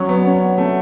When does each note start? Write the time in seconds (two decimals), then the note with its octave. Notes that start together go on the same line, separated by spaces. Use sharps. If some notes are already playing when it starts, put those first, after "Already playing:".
Already playing: F#3 C#4
0.09 B3
0.25 C#4
0.58 A3